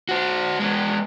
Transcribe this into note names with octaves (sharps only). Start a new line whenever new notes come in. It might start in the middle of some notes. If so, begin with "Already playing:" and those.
F#4 C5
G#3 B3